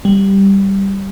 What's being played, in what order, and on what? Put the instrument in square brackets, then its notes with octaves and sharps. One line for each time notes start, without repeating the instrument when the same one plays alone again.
[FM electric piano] G3